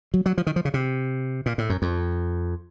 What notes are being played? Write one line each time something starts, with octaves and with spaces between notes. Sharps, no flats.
F#3
F#3
F3
D#3
F3
C#3
C3
A#2
A2
F#2
F2